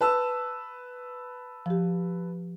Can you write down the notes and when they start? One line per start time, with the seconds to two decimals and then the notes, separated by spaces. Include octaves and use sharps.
0.01 B4 A5 E6
1.66 F3 G4